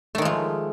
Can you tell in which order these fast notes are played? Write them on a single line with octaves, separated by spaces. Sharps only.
A3 D#3 G#3 F3